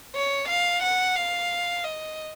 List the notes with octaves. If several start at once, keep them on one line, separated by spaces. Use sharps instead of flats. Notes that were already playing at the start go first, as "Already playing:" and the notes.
C#5
F5
F#5
F5
D#5